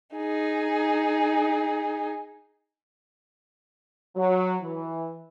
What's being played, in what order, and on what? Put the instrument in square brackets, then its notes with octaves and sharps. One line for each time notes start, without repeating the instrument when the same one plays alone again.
[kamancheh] D#4 G#4
[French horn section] F#3
E3